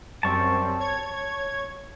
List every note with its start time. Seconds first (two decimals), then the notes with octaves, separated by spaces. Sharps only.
0.23 F#2 G3 C4 A5 C#6
0.80 C#5 G#6